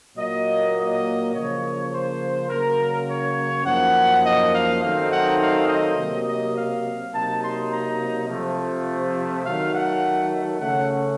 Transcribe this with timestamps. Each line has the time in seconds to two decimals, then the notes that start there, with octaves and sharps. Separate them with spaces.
0.17 A#2 F#3 A#3 D#5
0.76 D#5
1.34 C#3 F3 A#3 C#5
1.91 C5
2.49 C#3 F#3 A#3 C#4 A#4
3.08 C#5
3.65 F#2 F3 A#3 D#4 F#5
4.23 D#5
4.52 F5
4.81 D#3 F#3 A3 C4 D#4 F5
5.09 F#5
5.39 F5
5.68 D#5
5.97 C3 F#3 A#3
6.26 D#5
6.55 F5
7.13 C3 F#3 A#3 D#4 A5
7.42 C6
7.71 A#5
8.28 C3 F3 A3
9.44 D#3 F#3 A3 F5
9.73 F#5
10.60 C#3 A3 C#4 F#5